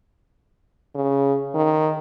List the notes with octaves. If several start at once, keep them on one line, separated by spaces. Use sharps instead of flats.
C#3
D#3